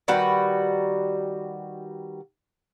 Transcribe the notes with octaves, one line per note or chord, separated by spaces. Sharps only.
D#3 G3 F#4 B4